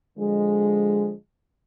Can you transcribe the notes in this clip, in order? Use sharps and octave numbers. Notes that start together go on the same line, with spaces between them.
D3 F3 G#3